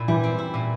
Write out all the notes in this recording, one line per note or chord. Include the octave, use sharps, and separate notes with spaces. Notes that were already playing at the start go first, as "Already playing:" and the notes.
Already playing: A#2 E4
E3 G3
C4
E4
A#2